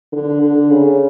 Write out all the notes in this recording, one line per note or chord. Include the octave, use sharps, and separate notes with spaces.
D3
D3
C#3